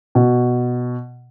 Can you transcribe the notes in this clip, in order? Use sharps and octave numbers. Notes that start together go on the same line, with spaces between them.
B2